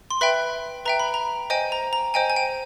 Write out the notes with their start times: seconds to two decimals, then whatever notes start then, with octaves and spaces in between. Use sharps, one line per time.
0.10 C6
0.21 B4 E5 G5 B5
0.85 B4 E5 G5 A#5
1.00 B5
1.14 A#5
1.50 C5 D#5 G5 G#5
1.72 A#5
1.93 A#5
2.14 C5 D#5 G5 G#5
2.30 G#5
2.36 G5